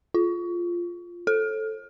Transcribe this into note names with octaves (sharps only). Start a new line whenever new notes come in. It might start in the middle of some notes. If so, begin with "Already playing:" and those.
F4
A4